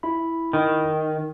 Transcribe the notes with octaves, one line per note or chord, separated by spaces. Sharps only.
E4 B5
D#3